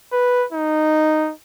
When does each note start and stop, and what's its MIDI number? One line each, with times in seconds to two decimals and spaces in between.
0.13 0.45 71
0.52 1.32 63